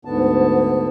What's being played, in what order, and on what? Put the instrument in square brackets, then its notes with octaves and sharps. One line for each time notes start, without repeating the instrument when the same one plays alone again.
[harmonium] D2 G#2 D3 B3 A5